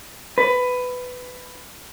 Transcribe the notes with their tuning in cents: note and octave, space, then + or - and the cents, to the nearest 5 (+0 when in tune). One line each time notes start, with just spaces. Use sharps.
B4 +15